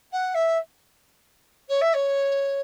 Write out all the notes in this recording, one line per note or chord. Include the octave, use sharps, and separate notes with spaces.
F#5
E5
C#5
E5
C#5